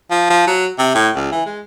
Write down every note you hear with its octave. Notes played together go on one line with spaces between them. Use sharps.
F3
F3
F#3
C3
A2
C#2
E3
G#3